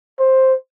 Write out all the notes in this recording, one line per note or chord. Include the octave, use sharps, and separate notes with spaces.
C5